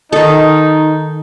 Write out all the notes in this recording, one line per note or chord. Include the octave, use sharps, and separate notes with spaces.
D#3 D#4 A4